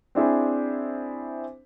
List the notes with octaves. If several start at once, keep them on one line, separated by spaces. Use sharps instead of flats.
C4 D4 E4 G#4 C5